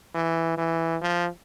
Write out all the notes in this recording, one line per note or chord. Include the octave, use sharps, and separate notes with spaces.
E3
E3
F3